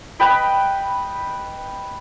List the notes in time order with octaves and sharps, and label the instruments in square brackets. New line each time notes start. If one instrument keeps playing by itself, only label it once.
[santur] B4 D#5 G5 B5